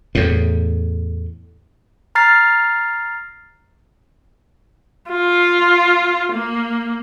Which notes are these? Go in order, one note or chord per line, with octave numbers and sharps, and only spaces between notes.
E2 A2
A#5 F6 A6 C7
F4
A#3